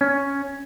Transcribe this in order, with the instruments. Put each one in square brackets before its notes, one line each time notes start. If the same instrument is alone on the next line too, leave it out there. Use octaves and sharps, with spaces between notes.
[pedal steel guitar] C#4